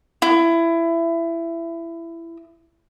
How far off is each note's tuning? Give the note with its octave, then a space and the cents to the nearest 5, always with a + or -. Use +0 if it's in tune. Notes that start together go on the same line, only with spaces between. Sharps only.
E4 +20